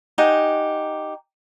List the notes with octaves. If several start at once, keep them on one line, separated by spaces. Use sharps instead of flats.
D#4 G4 F#5 G#5